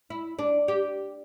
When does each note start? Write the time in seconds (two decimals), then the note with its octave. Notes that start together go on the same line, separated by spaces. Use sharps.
0.10 E4
0.39 D4
0.68 G4